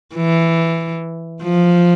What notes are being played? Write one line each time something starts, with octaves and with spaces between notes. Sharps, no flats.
E3
F3